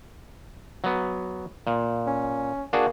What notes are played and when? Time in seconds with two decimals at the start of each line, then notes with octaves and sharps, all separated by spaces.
0.84 F#3 B3
1.67 A#2
2.07 C#4
2.73 A#3 D4 F#4 G#4